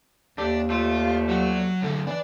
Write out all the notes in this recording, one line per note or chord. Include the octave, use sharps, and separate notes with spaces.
D#2 A3 D4 G4
F3 G3 A3 F4
F#3 F#4
F#2 D3 A3
E3 D4 D5